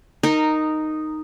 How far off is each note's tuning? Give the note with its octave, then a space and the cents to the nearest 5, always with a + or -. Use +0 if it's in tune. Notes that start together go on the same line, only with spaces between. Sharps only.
D#4 -5 A#4 -10